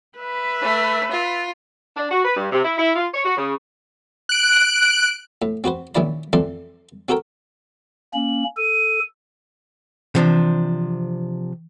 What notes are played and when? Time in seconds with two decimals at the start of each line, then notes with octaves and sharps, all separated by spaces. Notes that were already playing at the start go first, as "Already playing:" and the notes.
0.18 B4 E5
0.62 A3
1.12 F4
1.96 D4
2.11 F#4
2.25 B4
2.36 G2
2.52 C3
2.63 E4
2.78 E4
2.95 F4
3.13 C#5
3.25 F#4
3.37 C#3
4.29 F#6 D7
5.42 A2
5.64 C4 F#4 B4 C5
5.95 A#1 D#3 C#4 E4 D5 B5
6.33 F2 E3 C4 A4 D5 C6
7.09 C4 F#4 A4 A#4 G5
8.14 A#3 C#4 F#7
8.57 A4 D#7
10.15 C3 E3 F3 D4